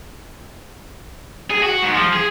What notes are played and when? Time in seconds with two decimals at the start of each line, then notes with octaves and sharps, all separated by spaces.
1.50 G#4
1.63 F#4
1.83 G#2
1.95 F3
2.13 G#4